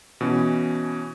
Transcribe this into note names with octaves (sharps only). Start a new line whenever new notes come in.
B2 E3 C#4